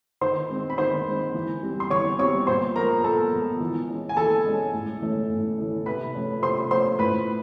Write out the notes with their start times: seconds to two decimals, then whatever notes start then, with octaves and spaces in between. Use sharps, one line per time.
0.21 D#3 C5 C6
0.49 G#3 C4
0.70 B5
0.78 D#3 C5 C6
1.06 G#3 C4
1.34 E3
1.63 G3 C4
1.80 C6
1.90 E3 C#5 C#6
2.19 G3 C4 C#5 C#6
2.47 A#2 C5 C6
2.76 F3 G#3 B3 A#4 A#5
3.04 A#2 A4 A5
3.32 F3 G#3 B3
3.60 E3
3.89 G#3 C#4
4.09 G#5
4.17 E3 A4 A5
4.45 G#3 C#4
4.74 A2
5.02 E3 A3 C#4
5.30 A2
5.58 E3 A3 C#4
5.86 C3 B4 B5
6.15 F3 A3 C#4
6.43 C3 C5 C6
6.70 F3 A3 C#4 C5 C6
6.99 A2 B4 B5